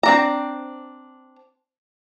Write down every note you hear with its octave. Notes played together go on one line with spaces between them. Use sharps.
C4 D4 A#5